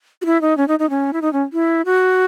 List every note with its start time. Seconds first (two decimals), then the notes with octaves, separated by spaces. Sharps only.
0.22 F#4
0.26 E4
0.42 D#4
0.57 C#4
0.68 D#4
0.79 D#4
0.90 C#4
1.13 E4
1.22 D#4
1.33 C#4
1.53 E4
1.86 F#4